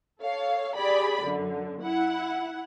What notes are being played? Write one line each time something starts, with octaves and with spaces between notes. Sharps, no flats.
A4 C#5 F5
G4 G#4 D5 B5
F#2 D3
E4 F#5